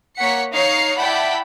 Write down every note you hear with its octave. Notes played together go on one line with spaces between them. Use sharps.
A#3 C#5 F#5 B6 C#7
D#4 C#5 F5 C7 C#7
E4 D5 F#5 G5 A5 B5